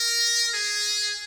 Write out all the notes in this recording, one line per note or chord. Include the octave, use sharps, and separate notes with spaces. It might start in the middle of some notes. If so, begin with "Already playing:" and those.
Already playing: A#4
G#4